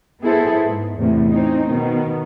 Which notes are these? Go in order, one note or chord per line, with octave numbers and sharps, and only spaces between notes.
B3 E4 G#4 A4 C5
G#2
E2 A2 C3
C4 C#4 D#4
B2 D#3 B3